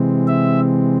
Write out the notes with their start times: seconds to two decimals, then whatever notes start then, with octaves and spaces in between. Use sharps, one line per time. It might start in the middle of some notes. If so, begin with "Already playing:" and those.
Already playing: C3 E3 G#3 C4
0.27 E5